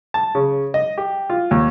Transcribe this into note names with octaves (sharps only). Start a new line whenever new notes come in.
A5
C#3
D#5
G4
F4
D#2